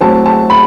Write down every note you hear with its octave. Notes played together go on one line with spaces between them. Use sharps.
A2 F#3 C4 A5
A5
B5